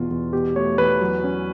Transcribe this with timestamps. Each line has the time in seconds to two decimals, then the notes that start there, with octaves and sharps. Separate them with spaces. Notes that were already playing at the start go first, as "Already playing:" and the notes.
Already playing: E2 B2 F4
0.11 E2
0.33 B2 G4
0.56 A3 C#5
0.78 E2 B4
1.01 F#3
1.24 C#4